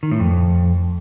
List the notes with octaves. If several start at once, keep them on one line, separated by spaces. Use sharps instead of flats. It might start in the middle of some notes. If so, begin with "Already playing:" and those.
D#3
A2
F2